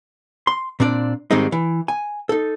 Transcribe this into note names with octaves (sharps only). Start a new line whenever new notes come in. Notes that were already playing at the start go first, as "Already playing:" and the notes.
C6
A#2 C4 D4 D5
G#2 D#3 G3 G#3 C4 D#4
E3
G#5
D#4 A4